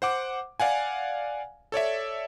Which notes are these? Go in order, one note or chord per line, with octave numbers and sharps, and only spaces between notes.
C5 F#5 D6
D5 F5 F#5 G#5
A4 C#5 D5 E5